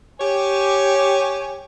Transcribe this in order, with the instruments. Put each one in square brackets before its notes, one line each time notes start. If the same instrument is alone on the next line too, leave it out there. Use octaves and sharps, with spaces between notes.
[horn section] G4 C#5 G#5